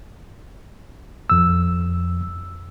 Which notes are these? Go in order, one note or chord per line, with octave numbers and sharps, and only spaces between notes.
F2 E6